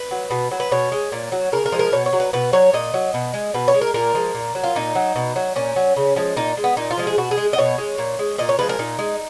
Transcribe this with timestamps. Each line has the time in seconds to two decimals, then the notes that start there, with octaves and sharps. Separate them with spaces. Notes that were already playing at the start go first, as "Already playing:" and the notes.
Already playing: B4
0.11 F#3
0.31 B2
0.51 F#3
0.60 B4
0.72 B2 C#5
0.92 G#3
1.12 A#2
1.32 F#3
1.52 C#3 A#4
1.66 A#4
1.72 F3 G#3
1.79 A#4
1.92 B2 C#5
2.06 C#5
2.13 F#3
2.20 B4
2.33 B2 B4
2.53 F#3 C#5
2.73 A#2 D#5
2.94 F#3
3.14 B2
3.34 G#3
3.54 B2 B4
3.68 C#5
3.74 G#3
3.81 A#4
3.94 A#2 A#4
4.15 F3 G#3
4.35 A#2
4.55 F#3
4.63 F4
4.75 A#2 D#4
4.95 F#3
5.16 B2
5.36 F#3
5.56 A#2 C#4
5.76 F#3
5.96 C#3
6.16 F3 G#3
6.36 A#2 D#4
6.57 G#3
6.64 B3
6.77 A#2 D#4
6.91 F4
6.97 F3 G#3
7.07 G#4
7.18 B2 F#4
7.31 G#4
7.37 G#3
7.53 D#5
7.58 B2 C#5
7.78 G#3
7.98 A#2
8.19 G#3
8.38 A#2 D#5
8.49 C#5
8.59 F3 G#3 B4
8.69 A#4
8.79 A#2 D#4
8.99 G#3